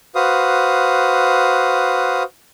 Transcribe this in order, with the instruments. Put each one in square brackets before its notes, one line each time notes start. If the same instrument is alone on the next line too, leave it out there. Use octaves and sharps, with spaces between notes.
[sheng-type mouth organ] F#4 B4 C5 F5 D#6